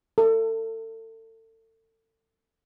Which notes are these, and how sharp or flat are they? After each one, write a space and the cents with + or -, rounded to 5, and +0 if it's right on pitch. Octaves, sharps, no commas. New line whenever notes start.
A4 +35